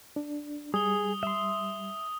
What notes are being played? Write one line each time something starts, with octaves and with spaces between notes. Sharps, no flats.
D4
G3 G#4 D#6 G7
E5 C6